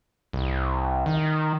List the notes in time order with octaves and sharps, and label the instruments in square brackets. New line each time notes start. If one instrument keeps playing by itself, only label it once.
[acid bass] C2
D#3